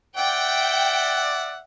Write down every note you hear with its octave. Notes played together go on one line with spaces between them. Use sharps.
D5 E5 F#5 G5